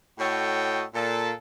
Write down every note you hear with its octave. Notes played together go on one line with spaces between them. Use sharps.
A2 F#4 A4 C#5 D#5 G5
A#2 A4